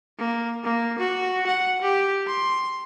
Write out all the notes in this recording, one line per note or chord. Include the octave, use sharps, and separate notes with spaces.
A#3
A#3
F#4
F#5
G4
C6